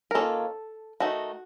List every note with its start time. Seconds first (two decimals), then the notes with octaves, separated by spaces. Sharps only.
0.11 A#4
0.15 D#3 A#3 C#4 F4 A4
1.00 D#3 A3 D#4 F#4